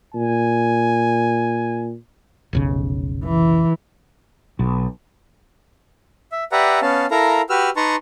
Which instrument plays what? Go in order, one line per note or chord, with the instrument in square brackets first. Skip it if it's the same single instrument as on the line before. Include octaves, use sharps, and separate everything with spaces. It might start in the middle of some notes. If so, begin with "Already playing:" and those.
[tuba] A#2 [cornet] G#5
[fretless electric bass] F1 B1 C#3
[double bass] E3
[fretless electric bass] B1
[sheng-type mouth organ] E5
G4 B4 D5 E5 F#5 A#5
B3 C#4 F5 A5
E4 A4 A#4 F5 A#5
F#4 G4 B4 E6 F6
D#4 B4 A5 A#5 C6 C#6